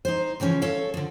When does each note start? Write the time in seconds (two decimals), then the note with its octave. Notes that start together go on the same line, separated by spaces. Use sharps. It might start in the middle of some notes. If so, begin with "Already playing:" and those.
0.05 D#4 C5
0.40 C#3 E3 F3 C#4
0.62 A4 C#5 F5
0.94 D3 F3